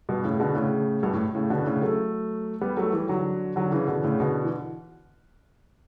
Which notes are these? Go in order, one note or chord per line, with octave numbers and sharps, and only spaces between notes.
G2 B2
A2 C#3
B2 D3
A2 C#3
G2 B2
A2
A2 C#3
B2 D3
A2 C#3
F#3 A3
G3 B3
F#3 A3
E3 G3
D3 F#3
D3 F#3
C#3 E3
B2 D3
A2 C#3
B2 D3
E3